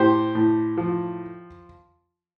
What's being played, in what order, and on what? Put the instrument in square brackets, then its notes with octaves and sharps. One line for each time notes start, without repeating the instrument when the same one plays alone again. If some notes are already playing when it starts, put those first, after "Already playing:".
Already playing: [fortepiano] A2 G4 C5
A2
F3